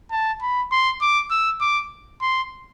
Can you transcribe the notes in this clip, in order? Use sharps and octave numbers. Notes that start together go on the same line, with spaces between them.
A5
B5
C6
D6
E6
D6
C6